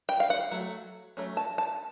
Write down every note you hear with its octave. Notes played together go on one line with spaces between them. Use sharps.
G5
F5
F#5
F#3 A3
F#3 A3 C#4
A5
A5